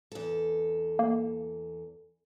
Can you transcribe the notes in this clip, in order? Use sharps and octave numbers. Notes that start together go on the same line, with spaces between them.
E2 A4
A#3